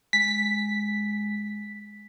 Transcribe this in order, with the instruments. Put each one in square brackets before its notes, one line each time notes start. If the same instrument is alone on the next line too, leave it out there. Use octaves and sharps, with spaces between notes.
[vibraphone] G#3 [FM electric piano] B6